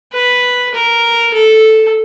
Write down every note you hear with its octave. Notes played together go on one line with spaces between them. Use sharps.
B4
A#4
A4